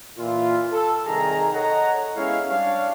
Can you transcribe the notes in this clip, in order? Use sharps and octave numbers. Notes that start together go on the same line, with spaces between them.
A#2 E3 E4 F4
A4
C2 D#3 G#4 A#5
A4 C#5 D#5 F#5 A#5
G#3 B3 C#4 E4 C#5 F5
G3 D4 C#5 F5